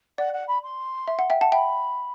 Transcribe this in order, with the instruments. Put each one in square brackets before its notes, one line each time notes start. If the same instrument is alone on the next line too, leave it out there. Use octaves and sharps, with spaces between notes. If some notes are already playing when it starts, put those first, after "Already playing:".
[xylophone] D5 [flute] F#5
[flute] F#5
B5
C6
[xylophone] E5
F#5
E5 G5
F#5 A5
[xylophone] E5 G5 [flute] B5